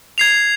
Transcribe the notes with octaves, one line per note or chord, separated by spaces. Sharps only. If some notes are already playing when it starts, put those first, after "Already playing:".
G#6 C7 F7